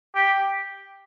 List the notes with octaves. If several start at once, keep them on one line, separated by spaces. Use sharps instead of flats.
G4